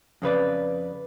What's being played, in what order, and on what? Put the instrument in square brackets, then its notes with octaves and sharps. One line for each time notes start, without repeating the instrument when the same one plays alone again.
[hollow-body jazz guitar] F2 C#3 B4 D5